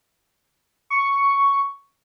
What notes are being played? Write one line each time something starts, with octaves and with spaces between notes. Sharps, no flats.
C#6